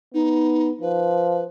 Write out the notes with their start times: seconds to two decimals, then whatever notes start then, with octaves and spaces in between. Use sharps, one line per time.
0.14 B3 D#4
0.81 F3 B4